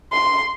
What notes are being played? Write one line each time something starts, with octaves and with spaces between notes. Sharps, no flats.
C6